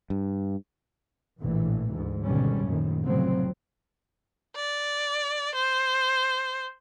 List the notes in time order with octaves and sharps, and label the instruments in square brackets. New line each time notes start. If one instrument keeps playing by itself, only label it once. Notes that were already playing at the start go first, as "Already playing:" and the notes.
[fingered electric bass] G2
[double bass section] A#1 A2 E3
D2 G#2
G#1 B2 D3 G3 C#4
A#1 F#2 A2 D#3
F1 A2 C#3 F3 F#3 C4
[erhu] D5
C5